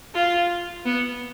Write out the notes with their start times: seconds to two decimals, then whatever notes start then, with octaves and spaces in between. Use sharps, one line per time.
0.15 F4
0.86 B3